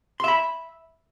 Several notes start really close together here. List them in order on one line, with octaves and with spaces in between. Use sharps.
C6 E5 B5